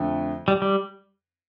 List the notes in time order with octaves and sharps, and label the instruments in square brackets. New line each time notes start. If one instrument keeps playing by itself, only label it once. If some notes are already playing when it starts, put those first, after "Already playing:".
Already playing: [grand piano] F2 D3 A3
[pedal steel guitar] G3
G3